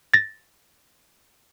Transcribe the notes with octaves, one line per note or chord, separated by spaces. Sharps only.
A6 A#6